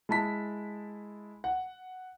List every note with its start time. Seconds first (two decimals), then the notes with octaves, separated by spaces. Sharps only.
0.09 G#3 E4 A5 B6
1.44 F#5